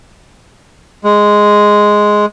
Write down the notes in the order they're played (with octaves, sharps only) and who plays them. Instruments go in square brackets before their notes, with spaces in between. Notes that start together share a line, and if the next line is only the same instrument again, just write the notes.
[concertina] G#3